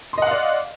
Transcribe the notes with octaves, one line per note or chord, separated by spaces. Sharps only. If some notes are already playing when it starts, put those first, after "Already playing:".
D5 D#5 F5 F#5 C6